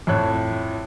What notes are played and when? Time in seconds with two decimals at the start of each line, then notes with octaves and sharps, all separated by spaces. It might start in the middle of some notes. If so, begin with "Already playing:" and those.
0.07 F2 A2 C#5 F#6